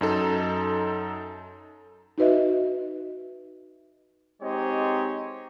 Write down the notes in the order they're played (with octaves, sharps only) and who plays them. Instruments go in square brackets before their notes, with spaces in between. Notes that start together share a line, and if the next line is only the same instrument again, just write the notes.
[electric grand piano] F#2 D#4 A4
[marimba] D#4 F#4 B4 D#5 E5
[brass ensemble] G#3 C4 D#4 G4 C#5 D#5